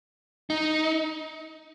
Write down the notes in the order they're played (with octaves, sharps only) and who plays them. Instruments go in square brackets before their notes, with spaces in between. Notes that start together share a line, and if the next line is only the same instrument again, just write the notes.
[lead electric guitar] D#4